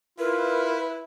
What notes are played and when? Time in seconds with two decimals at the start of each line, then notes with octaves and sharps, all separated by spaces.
0.19 E4 F4 A#4 B4